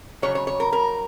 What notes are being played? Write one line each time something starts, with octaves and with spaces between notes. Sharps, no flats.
C#3 F#3 C#5
C#5
C#5
A#4
A#4